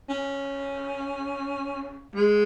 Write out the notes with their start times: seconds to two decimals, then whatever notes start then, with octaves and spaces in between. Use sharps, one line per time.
0.09 C#4
2.15 G#3